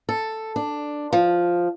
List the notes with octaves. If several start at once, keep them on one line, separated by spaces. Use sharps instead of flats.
A4
D4
F3